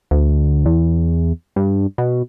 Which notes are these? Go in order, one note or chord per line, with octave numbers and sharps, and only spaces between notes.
D2
E2
G2
B2